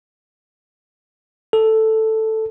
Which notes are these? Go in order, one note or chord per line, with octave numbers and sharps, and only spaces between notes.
A4